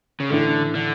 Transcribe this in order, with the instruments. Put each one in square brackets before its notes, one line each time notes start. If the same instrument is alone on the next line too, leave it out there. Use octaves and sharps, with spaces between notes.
[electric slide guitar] C#3
[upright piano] A2 E3 A3 D4 [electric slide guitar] D3
[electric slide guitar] D3